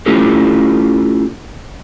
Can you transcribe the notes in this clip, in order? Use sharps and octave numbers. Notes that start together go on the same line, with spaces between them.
A3 C#4 E4 F4 G4 A4